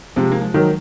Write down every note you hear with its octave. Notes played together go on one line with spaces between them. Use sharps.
C3 F3 G#3
A#3
F3 G#3
D#3 F#3